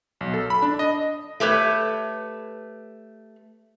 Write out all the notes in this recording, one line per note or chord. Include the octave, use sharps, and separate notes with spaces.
B1
A4
B5
D4
D#5
A3 G4 B4 C#5